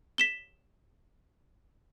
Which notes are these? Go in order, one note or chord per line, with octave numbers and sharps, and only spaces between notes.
B6 E7 G7